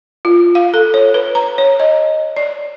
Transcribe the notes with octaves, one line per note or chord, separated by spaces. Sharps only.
F4
F5
A4
C#5
B4
A#5
C#5
D#5
D5